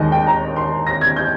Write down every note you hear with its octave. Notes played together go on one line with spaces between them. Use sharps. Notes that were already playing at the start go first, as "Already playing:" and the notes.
Already playing: D#2 D#3 G#3 D#5
G5
A#5
C6
A#6
G#6
G6